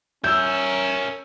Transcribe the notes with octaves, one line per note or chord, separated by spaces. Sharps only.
C#4 A#4 E5 E6 G6